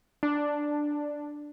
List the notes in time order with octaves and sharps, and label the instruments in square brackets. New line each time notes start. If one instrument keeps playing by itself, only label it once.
[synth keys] D4